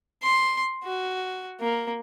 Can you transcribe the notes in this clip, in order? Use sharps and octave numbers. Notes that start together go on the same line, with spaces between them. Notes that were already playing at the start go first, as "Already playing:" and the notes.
C6
F#4
A#3